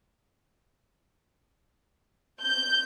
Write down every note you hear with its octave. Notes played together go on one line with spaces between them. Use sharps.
G6